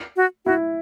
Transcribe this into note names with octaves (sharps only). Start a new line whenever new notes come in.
F#4
E4 F#4